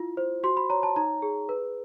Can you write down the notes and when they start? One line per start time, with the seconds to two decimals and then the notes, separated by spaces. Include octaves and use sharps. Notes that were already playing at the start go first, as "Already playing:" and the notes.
Already playing: E4 F4
0.17 C5
0.44 F#4 C6
0.57 B5
0.70 C#5 A#5
0.83 A5
0.96 D#4 A#5
1.22 G#4
1.49 B4